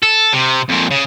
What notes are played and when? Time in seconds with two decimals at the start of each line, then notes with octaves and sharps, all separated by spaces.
0.03 A4
0.33 C3
0.69 F2 A#2
0.91 C#3